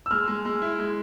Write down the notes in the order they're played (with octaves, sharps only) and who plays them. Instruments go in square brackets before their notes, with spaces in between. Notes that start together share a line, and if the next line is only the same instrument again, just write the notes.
[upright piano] E6
[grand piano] G#3 [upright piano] F6
[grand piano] G#3
G#3
E4
G#3